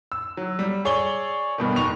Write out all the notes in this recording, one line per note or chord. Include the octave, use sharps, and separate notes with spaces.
E6
F#3
G3
G#4 C#5 D5 G7
G2 B2 D#3
F1 D#4 C#6 F7